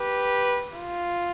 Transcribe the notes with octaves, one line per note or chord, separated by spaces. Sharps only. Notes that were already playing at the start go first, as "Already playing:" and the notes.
Already playing: G4 B4
F4